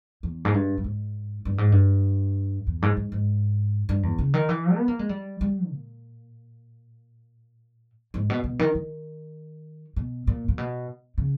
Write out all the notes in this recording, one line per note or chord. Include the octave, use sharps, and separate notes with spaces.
E2
G#2
G2
G2
G#2
G2
G#2
G2
E2
G#2
G#2
G#2
G2
E2
C#3
D#3
E3
B3
A#3
G#3
G3
G3
A#2
G#2
B2
B2
D#3
D#3
B2
A#2
A#2
B2
C#3